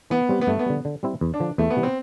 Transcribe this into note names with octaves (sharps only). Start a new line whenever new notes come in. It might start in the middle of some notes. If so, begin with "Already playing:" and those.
E3 B3
G3 C4 G4
B3
G2 A3
B3
D3 G3
D3
G3 C4 E4
E2
D4
D3 F3
E2 A3
B3
C3 E3 G3
C4